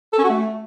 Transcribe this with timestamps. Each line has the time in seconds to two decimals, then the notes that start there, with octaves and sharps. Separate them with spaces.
0.13 A4
0.18 C#4
0.24 F#4
0.29 A3